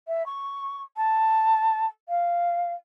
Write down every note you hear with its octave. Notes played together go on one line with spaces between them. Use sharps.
E5
C#6
A5
F5